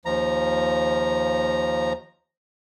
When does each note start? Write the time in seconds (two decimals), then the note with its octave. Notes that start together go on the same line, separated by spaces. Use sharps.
0.06 D#2 F3 A#5